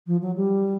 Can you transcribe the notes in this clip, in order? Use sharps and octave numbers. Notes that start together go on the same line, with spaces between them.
F3
F#3
G3